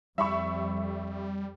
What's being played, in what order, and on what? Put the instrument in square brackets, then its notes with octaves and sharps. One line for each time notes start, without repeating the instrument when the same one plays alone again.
[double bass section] F2 [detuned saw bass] G3 [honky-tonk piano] E5 B5 C#6